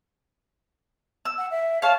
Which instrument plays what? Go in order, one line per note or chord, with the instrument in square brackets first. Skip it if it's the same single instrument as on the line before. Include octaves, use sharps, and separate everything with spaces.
[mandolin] E6
[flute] F#5
E5
[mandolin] C#5 F5 [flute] A5